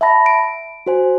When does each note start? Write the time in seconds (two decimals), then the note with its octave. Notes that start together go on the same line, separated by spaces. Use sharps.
0.01 E5 F#5 A5 B5 A#6
0.26 D7
0.86 F#4 C5 G#5